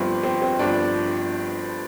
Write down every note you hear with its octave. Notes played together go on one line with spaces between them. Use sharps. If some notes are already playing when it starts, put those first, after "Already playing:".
Already playing: G1 G2 F3 C4
C4
C4
G1 G2 F3 D4